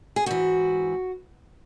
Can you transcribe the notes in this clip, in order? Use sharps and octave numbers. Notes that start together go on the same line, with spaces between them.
G#4
G#2 E3 F#4